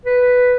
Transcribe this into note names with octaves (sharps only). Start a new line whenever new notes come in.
B4